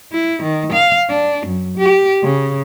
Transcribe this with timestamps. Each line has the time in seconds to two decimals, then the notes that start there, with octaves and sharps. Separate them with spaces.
0.13 E4
0.43 D#3
0.73 F5
1.10 D4
1.47 F#2
1.78 G4
2.23 C#3